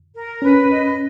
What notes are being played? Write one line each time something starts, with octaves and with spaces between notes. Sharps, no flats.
A#4
C#4 B4
D#5